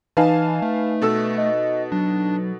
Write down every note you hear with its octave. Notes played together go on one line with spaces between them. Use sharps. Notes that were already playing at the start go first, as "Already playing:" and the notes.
E3 D#4 B4 F5 G#5 A5
A3
B2 A4 E6
D#5
F#3 D4